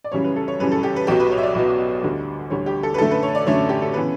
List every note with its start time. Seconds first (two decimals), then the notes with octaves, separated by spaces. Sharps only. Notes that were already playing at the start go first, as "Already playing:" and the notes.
0.04 D5
0.12 F#2 C#3 E3 G3 C#5
0.24 B4
0.36 A4
0.48 C#5
0.60 F#2 C#3 E3 G3 B4
0.72 A4
0.83 G4
0.96 B4
1.07 B1 B2 F#3 B3 G4
1.20 B4
1.32 C#5
1.38 E5
1.43 D5
1.55 B1 B2 F#3 B3
2.03 D2 D3 G3
2.50 D2 D3 G3 C#5
2.66 G4
2.83 A4
2.94 B4
2.98 F#2 D3 A3 A4
3.11 B4
3.23 C#5
3.35 D5
3.47 F#2 D3 A3 C#5
3.69 G4
3.82 A4
3.94 C#3 E3 B3 B4